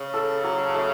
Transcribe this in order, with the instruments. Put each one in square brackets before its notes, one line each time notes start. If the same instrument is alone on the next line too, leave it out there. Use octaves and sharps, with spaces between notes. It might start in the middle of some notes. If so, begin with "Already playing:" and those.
Already playing: [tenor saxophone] C#3
[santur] A4
F#3
A3